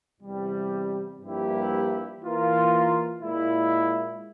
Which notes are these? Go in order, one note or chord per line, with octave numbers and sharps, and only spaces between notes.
E2 C3 G3
G2 F3 A#3 E4 G4
E3 A#3 F4 A#4
A#2 G#3 E4